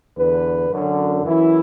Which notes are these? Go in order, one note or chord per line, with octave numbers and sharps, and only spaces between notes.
E2 D3 B4
F#2 D3
F#2 E3 E4